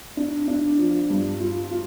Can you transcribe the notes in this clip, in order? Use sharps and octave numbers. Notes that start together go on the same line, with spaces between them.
D4
D4
F3
G2
F4
F4